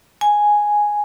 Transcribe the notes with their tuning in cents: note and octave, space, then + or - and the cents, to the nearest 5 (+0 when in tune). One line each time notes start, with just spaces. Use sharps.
G#5 +0